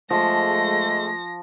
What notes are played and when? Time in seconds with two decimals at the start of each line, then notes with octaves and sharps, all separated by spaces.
0.10 F3 G#3 A3 A#6